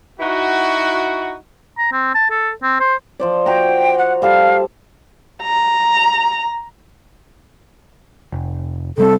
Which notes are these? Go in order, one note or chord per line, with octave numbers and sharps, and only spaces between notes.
D#4 E4 F#4
A#5
C4
A5
A4
C4
C5
F3 C5 D5
F#4 G5 A#5
F#5
G3 A4 F5 A5
A#5
F1
C3 G3 C4 A4